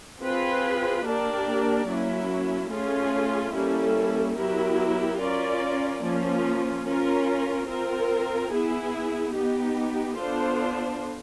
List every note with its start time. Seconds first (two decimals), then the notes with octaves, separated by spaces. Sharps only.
0.21 C4 F4 G#4 B4
1.04 A#3 D4 G4 A#4 D5
1.87 F#3 A#3 C#4 E4
2.71 A3 C#4 F4 G#4
3.53 G3 A#3 C#4 E4 A4
4.36 F#3 B3 E4 G4 A#4
5.19 C#4 F4 A#4 D5
6.02 F3 A#3 C#4 F4
6.85 C#4 F4 A#4
7.68 C4 F4 A#4
8.51 B3 E4 G#4
9.35 B3 D#4 G4
10.17 B3 D4 F4 A4 C5